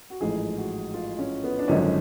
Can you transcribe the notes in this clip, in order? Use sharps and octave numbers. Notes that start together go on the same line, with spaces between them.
F#4
A1 G#2 F3 A3 G#4
F#4
F4
C#4
B3
D4
G#1 F#2 D3 F3 G#3 C#4